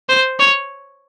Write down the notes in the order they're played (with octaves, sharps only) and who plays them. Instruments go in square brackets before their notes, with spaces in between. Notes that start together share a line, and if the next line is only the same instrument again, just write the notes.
[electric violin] C5
C#5